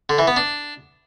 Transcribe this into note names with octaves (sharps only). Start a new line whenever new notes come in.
D3
E3
B3
D4